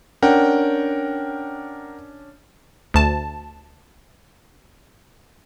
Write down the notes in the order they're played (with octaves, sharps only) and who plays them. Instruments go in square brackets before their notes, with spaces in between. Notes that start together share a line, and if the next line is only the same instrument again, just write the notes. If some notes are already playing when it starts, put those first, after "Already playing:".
[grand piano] C#4 D4 [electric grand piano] A#4 F#5 G5
[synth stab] D2 A5